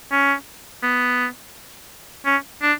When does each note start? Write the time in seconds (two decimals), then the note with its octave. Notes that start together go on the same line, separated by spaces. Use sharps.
0.11 C#4
0.83 B3
2.26 C#4
2.62 D4